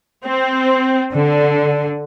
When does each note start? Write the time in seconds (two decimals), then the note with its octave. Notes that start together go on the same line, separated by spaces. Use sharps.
0.23 C4
1.12 D3